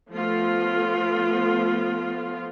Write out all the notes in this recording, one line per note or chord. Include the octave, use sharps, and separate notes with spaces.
F3 A3 B3 F4